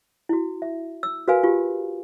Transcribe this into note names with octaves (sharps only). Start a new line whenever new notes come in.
E4 F#4
E5
E6
F#4 A#4 B4 F5 G#5
F4 G4